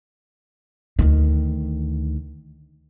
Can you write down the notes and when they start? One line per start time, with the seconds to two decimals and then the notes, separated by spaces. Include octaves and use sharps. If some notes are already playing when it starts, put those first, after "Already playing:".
0.99 D2 D#3